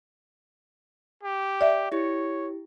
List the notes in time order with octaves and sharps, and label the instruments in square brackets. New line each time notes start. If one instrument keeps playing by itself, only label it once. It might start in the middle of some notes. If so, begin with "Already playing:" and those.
[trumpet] G4
[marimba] D5 E5
[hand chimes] E4 G4 [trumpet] C#5